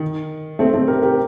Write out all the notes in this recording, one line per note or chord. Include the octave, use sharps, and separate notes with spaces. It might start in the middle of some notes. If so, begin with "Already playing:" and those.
Already playing: D#3
A3 C4
A3 C4
G4 A#4
G4 A#4